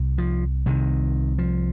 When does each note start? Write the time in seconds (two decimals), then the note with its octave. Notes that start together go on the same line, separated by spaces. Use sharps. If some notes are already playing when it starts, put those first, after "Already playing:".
Already playing: C2 C3
0.18 F3
0.66 C2 C3 D#3
1.38 F3